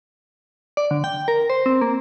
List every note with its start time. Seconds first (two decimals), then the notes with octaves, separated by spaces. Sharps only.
0.77 D5
0.91 D3
1.04 G5
1.28 A#4
1.50 C5
1.66 C4
1.81 A#3